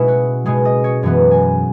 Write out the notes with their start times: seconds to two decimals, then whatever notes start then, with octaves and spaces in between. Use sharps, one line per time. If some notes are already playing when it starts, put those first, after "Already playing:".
Already playing: B2 G#3 C#4 E4
0.08 F#4
0.46 B2 G#3 C#4 G#4
0.65 D#5
0.84 C#5
1.03 F#2 E3 B3 C#5
1.31 G#5